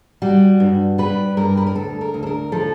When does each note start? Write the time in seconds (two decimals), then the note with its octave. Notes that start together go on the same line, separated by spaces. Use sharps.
0.22 G3 F#4
0.60 G2
0.98 G3 B4
1.37 G2 A#4
1.57 B4
1.67 A#4
1.75 D2 A4
2.01 A#4
2.14 D2
2.23 A4
2.27 A#4
2.52 F3 A4